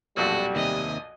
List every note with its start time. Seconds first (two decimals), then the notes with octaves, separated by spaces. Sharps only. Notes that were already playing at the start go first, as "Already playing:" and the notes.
0.17 B1 F2 A#2 G3 F#4
0.56 D#2 C3 D#5 G#5